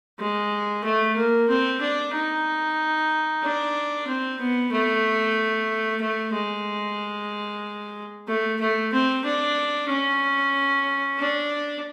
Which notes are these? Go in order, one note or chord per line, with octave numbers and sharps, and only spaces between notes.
G#3
A3
A#3
C4
D4
D#4
D4
C4
B3
A3
A3
G#3
A3
A3
C4
D4
C#4
D4